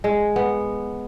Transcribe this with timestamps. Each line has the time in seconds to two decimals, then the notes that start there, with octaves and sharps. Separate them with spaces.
0.04 G#3
0.36 B3